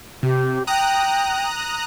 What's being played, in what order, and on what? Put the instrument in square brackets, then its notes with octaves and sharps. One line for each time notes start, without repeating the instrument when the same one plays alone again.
[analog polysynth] C3 [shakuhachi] G4
[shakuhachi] G5 [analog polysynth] A#5 D#6 F#6